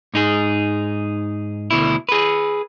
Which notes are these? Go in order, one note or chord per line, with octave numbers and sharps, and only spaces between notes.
G#2 D#4 G#4
D2 B2 E4
G#4 B4